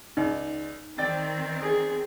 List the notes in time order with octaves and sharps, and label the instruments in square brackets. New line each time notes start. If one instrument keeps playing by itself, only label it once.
[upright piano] C#2 D5 [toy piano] D#4
[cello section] D#3 C4 [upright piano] D5 G5 A6
[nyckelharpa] G#4